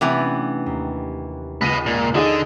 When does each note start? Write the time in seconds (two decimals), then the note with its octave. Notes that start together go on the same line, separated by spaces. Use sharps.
0.01 C3 E3 A3 B3 C#4 D4
0.66 D#2
1.61 C#2 B4 D#5 D#7
1.86 A#2 G6
2.15 D3 D#4 G#4 D#5